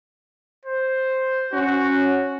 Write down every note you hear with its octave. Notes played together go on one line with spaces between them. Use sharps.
C5
C#4 F#4